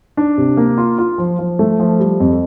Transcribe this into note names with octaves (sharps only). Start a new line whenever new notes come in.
D4
C3
A#3
F4
F4
F3
F3
A3
F3
G3
F2